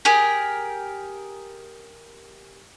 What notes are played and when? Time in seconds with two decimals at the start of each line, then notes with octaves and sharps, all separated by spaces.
0.05 G4 G#4 A#4